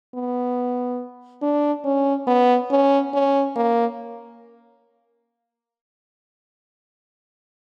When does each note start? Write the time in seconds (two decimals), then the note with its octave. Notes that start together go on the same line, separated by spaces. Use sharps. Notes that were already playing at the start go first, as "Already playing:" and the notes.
0.14 B3
1.42 D4
1.84 C#4
2.27 B3
2.71 C#4
3.14 C#4
3.56 A#3